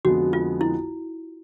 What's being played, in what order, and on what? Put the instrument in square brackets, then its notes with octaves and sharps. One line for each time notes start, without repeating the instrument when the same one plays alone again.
[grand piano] F2 D3 F3 G#3 B3 [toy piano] F#4
[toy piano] F4
E4